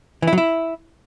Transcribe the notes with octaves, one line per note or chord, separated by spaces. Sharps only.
E3
E4
F#3
E4